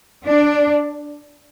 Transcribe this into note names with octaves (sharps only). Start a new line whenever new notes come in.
D4